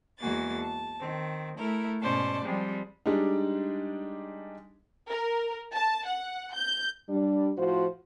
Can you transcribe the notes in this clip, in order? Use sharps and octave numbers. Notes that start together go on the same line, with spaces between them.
E2 G#3 A#3 F#4 G#5 A6
A5
D#3 C4
A3 E4 A#4
G#2 B2 C#4 C5 D5 A5
F3 G3 G#3 C4
G3 G#3 D4 D#4
A#4
A5
F#5
G6
G3 D4
A2 F3 F4 F#4 C5